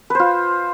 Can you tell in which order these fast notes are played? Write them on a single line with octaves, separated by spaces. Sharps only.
B4 C5 F4